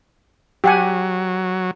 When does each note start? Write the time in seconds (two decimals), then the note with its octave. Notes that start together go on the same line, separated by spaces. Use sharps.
0.64 F#3 G4 F#5 G#5